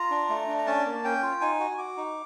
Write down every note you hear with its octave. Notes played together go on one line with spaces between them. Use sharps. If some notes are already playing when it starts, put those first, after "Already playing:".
Already playing: F4 A#5
D4
A3
D4
A#5
C#4 A5
A#3
C#4 G5
F4
D#4 G#5
F#4
F#4 D6
D#4